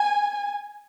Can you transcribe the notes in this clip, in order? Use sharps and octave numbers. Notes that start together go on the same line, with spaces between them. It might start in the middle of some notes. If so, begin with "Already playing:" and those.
Already playing: G#5